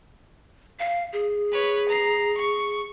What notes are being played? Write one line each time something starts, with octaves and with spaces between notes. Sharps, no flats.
F5
G#4
B4 C#5
A#5 C7
C#6